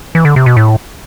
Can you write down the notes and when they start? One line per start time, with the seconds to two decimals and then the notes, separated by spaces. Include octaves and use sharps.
0.15 E3
0.25 D3
0.36 C3
0.46 B2
0.57 A2